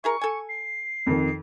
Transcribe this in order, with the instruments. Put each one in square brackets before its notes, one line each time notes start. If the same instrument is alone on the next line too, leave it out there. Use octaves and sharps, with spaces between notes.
[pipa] E4 G#4 A#4 [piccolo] C#6
[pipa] A4 G#5
[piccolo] C7
[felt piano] F2 D#3